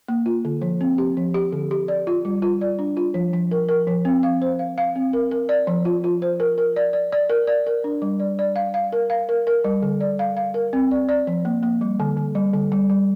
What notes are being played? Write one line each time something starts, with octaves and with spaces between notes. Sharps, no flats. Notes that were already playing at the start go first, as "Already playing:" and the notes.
A#3
F4
D3
F3
C4
G4
F3
G4
D3
G4
D5
F4
G3
F4
D5
D4
F4
F3
F3
A#4
A#4
F3
C4
F5
C5
F5
F5
C4
A#4
A#4
D5
F3
F4
F4
C5
A#4
A#4
D5
D5
D5
A#4
D5
A#4
D4
G3
D5
D5
F5
F5
A#4
F5
A#4
A#4
G3
D3
D5
F5
F5
A#4
C4
D5
D5
F3
A#3
A#3
G3
D3
D3
G3
D3
G3
G3